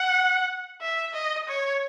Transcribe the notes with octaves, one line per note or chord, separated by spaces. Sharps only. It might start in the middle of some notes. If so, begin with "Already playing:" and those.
Already playing: F#5
E5
D#5
C#5